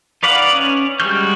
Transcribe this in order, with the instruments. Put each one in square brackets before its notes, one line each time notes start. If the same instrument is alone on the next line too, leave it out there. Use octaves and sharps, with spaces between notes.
[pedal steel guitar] D#4 B4 D5 F5 F#5
C#4
G3 G#3 F#4 F6 G6